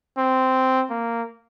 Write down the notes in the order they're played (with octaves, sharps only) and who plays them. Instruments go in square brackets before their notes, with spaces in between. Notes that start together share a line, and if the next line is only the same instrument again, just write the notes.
[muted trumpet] C4
A#3